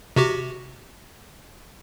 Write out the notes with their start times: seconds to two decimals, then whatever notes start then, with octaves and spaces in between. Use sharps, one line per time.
0.16 C3 F#4 G4